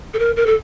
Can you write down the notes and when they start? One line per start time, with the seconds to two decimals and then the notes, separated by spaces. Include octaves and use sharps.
0.14 A4
0.19 A#4
0.36 A#4
0.46 A4